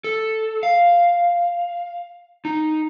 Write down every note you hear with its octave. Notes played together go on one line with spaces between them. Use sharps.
A4
F5
D#4